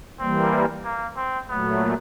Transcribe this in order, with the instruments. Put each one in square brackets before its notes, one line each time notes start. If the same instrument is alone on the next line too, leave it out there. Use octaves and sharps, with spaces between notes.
[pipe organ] E3 G3 A#3 [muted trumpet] C4
[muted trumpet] A#3
C4
[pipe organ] A#2 F#3 A3 [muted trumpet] B3